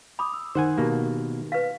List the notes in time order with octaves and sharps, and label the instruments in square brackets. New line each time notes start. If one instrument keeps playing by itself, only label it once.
[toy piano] B5 [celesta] D6 D#6
[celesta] E6
[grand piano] D#3 [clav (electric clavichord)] C5 F#5 G#5
[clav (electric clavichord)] B2 A#3 [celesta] G4
[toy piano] B4 F5